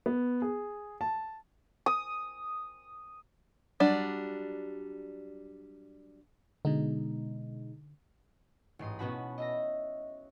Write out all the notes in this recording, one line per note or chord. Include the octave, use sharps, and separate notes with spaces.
B3
G#4
A5
D#6
F#3 G3 D4
B2 D3 G#3 D#4
A1 G#2 C6 D#6
B2 B3 C#4 F#4 A5 B5
D#5 E5 A#6